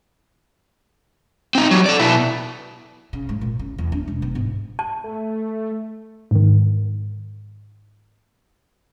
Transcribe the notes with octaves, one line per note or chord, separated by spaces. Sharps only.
C4 D#4
F#3 G3
A4 D5
B2 E4
C#3
G#2
A#2
C#3
E2
D4
E1
B3
G#2
A5
A3
G#2 D#3